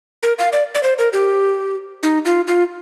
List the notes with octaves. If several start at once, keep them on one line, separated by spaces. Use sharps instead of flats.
A#4
F5
D5
D5
C5
A#4
G4
D#4
F4
F4